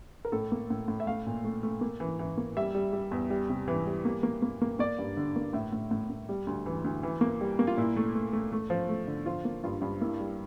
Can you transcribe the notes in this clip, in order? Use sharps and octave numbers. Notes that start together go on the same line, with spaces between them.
A#4
A2 A4
A#3
A2
A2
E5
A3 F5
A#2
A3
A3
A#3
E3
E3
A#3
G3 E5
G3
G3
E2
G3
C3
E3
G3
A#3
A#3
A#3
A#3
A#3 D5
G2
D3
A#3
A2 E5
A2
A2
A2
G3
D2
E3
D2
E3
A#3
G3
A#3
F4
A#2 E4
A3
A3
A3
A3
F3
A3
D3
F3 F4
A#3
G2 F4
G2
A#3 E4
G3